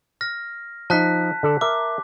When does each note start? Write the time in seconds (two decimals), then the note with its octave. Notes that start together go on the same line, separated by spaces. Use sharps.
0.21 F6 A#6
0.90 F3 D#4 A5 F#6 B6
1.43 D3 A4 D5
1.61 A#4 E5 D6